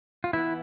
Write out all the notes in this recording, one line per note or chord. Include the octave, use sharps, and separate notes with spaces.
F4
E3 B3 E4